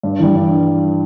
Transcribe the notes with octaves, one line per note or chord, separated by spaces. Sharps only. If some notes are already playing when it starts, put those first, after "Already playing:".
G2
E3 G3
G2